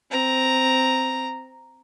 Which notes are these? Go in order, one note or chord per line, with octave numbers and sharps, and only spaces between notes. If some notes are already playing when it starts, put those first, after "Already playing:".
C4 A#5